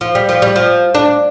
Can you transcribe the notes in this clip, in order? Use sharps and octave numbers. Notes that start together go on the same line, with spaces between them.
F3
G3
F3
G3
F3
D4